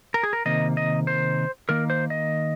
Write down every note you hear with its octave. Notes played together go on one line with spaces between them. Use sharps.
A#4
G#4
A#4
C3 D#3 A#3 D#5
D#5
C5
D#3 A#3 A#4
C5
D#5